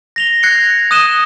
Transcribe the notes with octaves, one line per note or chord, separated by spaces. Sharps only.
A#6 F7 G7
F#6 G#6 A#6 C7 C#7
D#6 F#6 D#7 E7 G7